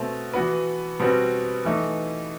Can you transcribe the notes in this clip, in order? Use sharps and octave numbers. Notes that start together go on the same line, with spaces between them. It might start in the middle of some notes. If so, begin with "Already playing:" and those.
Already playing: B2 A3 C4
E3 B3 F#4 B4
B2 G3 C4 F#4 B4
E3 A3 D#4